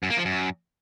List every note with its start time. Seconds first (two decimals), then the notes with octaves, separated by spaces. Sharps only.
0.03 F#2
0.10 A#3
0.18 F3
0.25 F#2